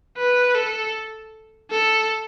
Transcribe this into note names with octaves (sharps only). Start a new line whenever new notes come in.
B4
A4
A4